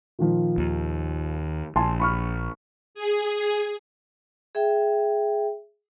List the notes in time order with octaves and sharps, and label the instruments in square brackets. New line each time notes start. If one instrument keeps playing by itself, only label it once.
[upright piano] A#2 D#3 F3
[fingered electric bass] D#2
[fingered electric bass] A#1 [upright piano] G#5 A5 C6
[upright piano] B5 C#6 F6
[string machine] G#4
[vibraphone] G#4 E5 G5